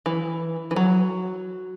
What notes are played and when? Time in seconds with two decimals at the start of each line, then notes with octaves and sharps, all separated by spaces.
0.06 E3
0.71 E3
0.76 F#3